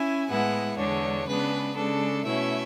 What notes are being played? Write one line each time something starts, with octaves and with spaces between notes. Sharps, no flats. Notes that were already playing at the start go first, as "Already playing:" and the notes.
Already playing: C#4 E4 G#5
A2 G#3 B3 E4 F#5
E2 D3 G#3 D4 C#5
C#3 G#3 B3 D4 B4
C#3 G#3 D4 A4
B2 A3 C#4 E4 E5